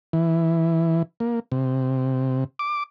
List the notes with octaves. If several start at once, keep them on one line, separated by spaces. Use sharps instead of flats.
E3
A#3
C3
D6